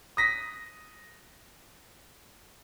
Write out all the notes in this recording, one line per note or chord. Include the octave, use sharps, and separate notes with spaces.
D#6 A#6 B6